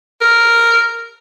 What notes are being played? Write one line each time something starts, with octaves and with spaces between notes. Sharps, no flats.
A#4